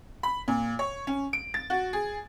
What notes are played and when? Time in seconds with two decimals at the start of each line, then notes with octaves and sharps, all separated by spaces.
0.23 B5
0.48 A#2
0.79 C#5
1.07 C#4
1.33 D7
1.54 A6
1.70 F#4
1.93 G#4